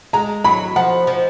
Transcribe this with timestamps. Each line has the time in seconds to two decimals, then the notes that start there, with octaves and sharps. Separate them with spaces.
0.13 G#3 A#5
0.44 F#3 B5
0.76 F3 F#5
1.07 F3